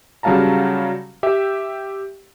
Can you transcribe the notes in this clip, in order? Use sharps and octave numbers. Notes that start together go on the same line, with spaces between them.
C#3 F#3 G3 F5 A5 A#5
G4 E5 G5